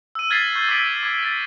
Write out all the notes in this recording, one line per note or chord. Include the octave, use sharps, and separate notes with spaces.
E6 D#7
F6 G#6 A6 B6 C7 F#7
C#6 G6 G7
D6 E6 A6 B6 D7 F#7
D6 G#6
A6 B6